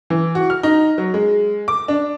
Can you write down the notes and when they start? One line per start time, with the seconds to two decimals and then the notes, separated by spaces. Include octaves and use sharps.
0.10 E3
0.35 F#4
0.50 F6
0.63 D#4
0.98 F#3
1.14 G#3
1.68 D6
1.88 D4